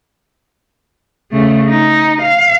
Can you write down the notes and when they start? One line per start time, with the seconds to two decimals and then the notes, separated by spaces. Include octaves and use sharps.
1.31 C#3 A3
1.69 D#4
2.22 F5